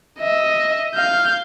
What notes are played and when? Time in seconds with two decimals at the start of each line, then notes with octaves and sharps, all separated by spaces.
0.20 D#5 E5
0.95 F5 G6